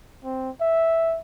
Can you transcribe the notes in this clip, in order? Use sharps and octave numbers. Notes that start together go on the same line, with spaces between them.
C4
E5